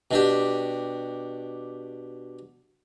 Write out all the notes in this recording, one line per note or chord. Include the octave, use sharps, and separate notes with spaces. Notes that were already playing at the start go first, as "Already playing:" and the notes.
B2 D4 G4